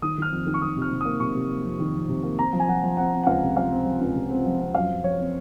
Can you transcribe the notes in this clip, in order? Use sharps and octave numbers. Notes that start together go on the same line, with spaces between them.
D#3 D#6
D#3 F6
F2
D#3
C#6
D#3 D#6
C3
F6
C3
A#3 D#6
C3 C#6
C3
A#3
F2
D#3
F2
C3
A#3
C4 A#5
F3
G#5
F3 F#5
F3
C4 F#5
C4
F#5
C#2 F5
C3
F3 F5
C4
F3
C#2
C3
C4
F3
C4
F#2 F5
F#2
F3 C#5
C4